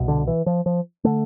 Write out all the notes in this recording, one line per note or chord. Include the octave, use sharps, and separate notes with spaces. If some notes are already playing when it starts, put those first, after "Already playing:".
Already playing: C2 B2
D3
E3
F3
F3
D3 A3